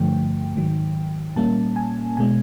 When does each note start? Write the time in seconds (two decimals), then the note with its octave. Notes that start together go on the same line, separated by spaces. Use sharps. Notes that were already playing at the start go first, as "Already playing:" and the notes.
Already playing: G2 D3 F3 A3 G5
0.55 G#2 D#3 F#3
1.36 A#2 G3 A#3 C#4 A5
1.76 G#5
2.17 B2 G#3 G#5